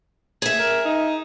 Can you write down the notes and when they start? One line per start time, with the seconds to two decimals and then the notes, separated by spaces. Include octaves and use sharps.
0.42 G#4 E5
0.59 A#4
0.85 D#4